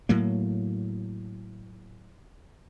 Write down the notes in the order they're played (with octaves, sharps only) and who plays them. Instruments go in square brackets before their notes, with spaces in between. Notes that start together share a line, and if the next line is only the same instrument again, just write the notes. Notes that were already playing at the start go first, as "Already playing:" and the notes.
[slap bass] A2 F#3 A#3